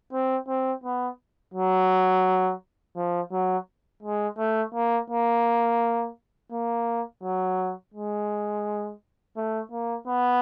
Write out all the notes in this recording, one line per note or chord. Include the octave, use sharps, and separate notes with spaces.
C4
C4
B3
F#3
F3
F#3
G#3
A3
A#3
A#3
A#3
F#3
G#3
A3
A#3
B3